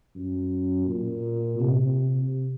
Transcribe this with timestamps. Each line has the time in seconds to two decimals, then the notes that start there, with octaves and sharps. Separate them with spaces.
0.15 F#2
0.87 A#2
1.60 C3